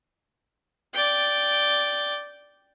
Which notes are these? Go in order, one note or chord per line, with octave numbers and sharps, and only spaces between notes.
D5 G5